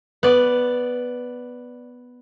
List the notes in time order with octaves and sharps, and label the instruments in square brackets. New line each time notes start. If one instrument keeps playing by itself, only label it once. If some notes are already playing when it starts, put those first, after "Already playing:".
[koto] B3 D5